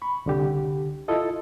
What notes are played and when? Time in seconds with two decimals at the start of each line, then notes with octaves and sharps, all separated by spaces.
0.02 B5 C#6
0.26 C2 D3 G4
1.08 E4 F4 A4 D#5